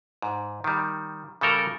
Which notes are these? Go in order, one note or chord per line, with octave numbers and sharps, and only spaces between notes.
G#2
D#3 G3
C#3 G3 A4 A#4